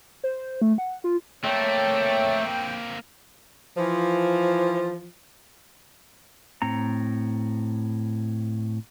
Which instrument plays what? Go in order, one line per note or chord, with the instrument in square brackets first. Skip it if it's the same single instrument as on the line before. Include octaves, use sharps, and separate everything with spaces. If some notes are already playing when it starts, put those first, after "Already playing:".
[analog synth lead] C5
A3
F#5
F4
[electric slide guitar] A3 [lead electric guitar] A#3 C4 [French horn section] C#5 [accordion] G5
[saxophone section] E3 F3
[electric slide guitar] A2 C4 A#5